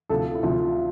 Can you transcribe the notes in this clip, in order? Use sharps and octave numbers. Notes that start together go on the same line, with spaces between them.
D2 C3 F3 A4
E4
D2 C3 F3 F4